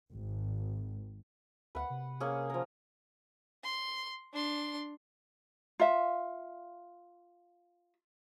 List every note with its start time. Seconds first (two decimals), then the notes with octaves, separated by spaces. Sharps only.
0.11 G#1
1.75 D2 B4 F#5
1.90 C3
2.20 A#3 C#4 G#4
2.50 F3 A#4
3.64 C6
4.33 D4 C6
5.80 F4 E5